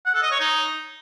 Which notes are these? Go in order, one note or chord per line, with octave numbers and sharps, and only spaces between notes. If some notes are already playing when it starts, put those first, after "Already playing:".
F#5
A4
D#5
C#5
D#4